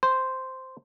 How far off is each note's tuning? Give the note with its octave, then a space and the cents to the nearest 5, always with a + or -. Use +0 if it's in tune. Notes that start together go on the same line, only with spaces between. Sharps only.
C5 -5